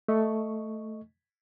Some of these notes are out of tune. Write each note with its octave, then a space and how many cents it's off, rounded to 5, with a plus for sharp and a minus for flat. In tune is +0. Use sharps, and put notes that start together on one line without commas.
A3 +0 D#5 +0 C#6 +0